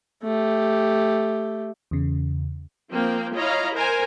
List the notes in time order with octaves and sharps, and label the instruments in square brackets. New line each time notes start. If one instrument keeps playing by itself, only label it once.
[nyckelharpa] A3 G4
[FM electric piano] E2 C#3
[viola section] F3 A#3 C4 F5 G5
E4 F4 C#5 D#5 F5 A#5
A#4 C5 G#5 A#5